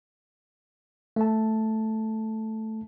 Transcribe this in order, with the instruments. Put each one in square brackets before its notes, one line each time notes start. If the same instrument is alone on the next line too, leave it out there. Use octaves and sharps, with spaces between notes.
[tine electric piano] A3 A5